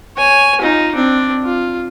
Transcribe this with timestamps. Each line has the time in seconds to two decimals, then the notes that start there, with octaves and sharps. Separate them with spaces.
0.18 C#5 G#5
0.61 D#4 F4
0.95 C4 D4
1.43 F4